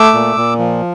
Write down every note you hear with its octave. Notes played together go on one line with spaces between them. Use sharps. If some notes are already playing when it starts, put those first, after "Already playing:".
Already playing: A3 D6 E6
A#2
A#2
F3